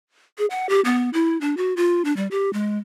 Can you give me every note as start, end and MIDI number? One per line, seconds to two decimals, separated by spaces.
0.38 0.46 68
0.50 0.69 78
0.69 0.81 67
0.85 1.10 59
1.13 1.39 64
1.41 1.55 62
1.57 1.74 66
1.77 2.02 65
2.05 2.14 62
2.16 2.28 55
2.31 2.52 67
2.53 2.78 56